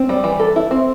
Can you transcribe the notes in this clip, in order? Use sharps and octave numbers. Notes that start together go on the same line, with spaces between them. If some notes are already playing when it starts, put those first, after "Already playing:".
Already playing: C4
G3
E3
A4
E4
C4